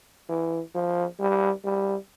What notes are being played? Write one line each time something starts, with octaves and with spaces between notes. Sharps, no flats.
E3
F3
G3
G3